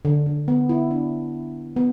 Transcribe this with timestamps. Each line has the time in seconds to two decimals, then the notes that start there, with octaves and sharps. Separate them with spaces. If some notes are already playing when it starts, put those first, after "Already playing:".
0.05 D3
0.26 D3
0.48 B3
0.69 E4
0.91 D4
1.76 B3